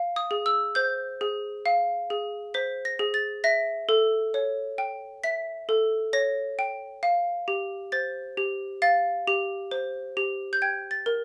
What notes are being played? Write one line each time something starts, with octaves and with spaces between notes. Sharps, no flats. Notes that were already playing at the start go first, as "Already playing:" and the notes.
Already playing: F5
D#6
G#4
E6
C5 G6
G#4
F5
G#4
C5 B6
A#6
G#4
A6
E5 A#6
A4
C#5
G5
E5 B6
A4
C#5 A#6
G5
F5
G4
C5 A6
G4
F5 A6
G4
C5
G4
G6
G5 G#6
A6
A#4